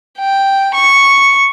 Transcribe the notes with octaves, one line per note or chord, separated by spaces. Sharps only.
G5
C#6